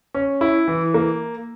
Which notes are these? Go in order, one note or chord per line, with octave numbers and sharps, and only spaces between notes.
C#4
E4
E3
A#3